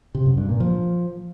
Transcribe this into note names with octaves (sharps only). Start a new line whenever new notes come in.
C3
F#2
G2
A#2
F3